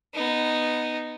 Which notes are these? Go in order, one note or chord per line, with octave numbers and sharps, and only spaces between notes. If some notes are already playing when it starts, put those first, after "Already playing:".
B3 D#4